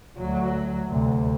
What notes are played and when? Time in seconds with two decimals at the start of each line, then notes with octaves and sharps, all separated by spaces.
0.18 D2 F#3
0.89 D2 C3